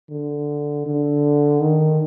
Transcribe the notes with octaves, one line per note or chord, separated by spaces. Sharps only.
D3
D3
D#3